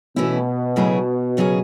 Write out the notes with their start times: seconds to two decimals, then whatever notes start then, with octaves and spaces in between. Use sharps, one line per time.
0.16 B2 E3 A3 C#4 E4
0.76 C#3 F#3 A3 E4 G#4
1.37 F#2 C#3 F#3 C#4 G#4